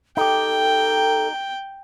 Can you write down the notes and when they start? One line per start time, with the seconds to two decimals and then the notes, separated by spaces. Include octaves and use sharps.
0.17 D#4 G4 A4 G5